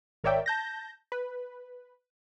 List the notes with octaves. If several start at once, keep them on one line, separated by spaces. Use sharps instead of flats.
G#1 A#4 C#5 D5 E5 G5
A5 G6 A#6
B4